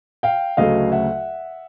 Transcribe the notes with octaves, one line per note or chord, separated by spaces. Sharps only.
F5 G5
D2 C#3 F#3 A3 D#5 F5
E5 F#5